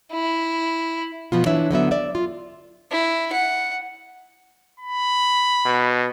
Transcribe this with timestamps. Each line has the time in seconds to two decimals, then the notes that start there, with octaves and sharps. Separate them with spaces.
0.12 E4
1.32 B2 F3 B3 F4
1.46 E3 D4 E4 B4 C#5 E5
1.71 D3 F#3 B3 E5
1.91 D5 E5
2.15 F4
2.91 E4
3.33 F#5
4.79 B5
5.65 B2